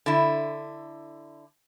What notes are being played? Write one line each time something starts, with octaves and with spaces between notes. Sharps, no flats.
D3 E4